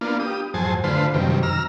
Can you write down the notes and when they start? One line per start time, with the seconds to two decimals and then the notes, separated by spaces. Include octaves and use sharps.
0.01 A#3 B3 D4 F4
0.20 G4 D#6
0.54 F2 G#2 F#3 C5 G#5 A5
0.84 D3 A3 F4 B4 C5
1.14 F#2 C3 D#3 G3
1.43 A#5 E6 F6